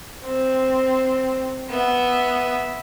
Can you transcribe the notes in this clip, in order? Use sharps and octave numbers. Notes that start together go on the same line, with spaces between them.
C4
B3 E5